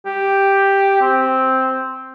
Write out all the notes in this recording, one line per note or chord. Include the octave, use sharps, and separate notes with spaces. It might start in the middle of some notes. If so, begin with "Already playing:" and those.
G4
C4